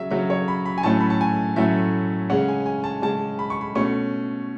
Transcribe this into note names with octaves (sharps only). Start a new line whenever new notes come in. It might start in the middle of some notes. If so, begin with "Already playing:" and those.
Already playing: C#3 F#3 C#4 E5
C#3 F#3 C#4 E5
C#5
B5
B5
G#5
A2 F#3 A3 C#4 A5
B5
A5
G#5
A2 F#3 A3 C#4 E5
C#3 G#3 C#4 F#5
G#5
G#5
A5
C#3 G#3 C#4 A5
B5
C#6
B5
B2 A3 C#4 C#6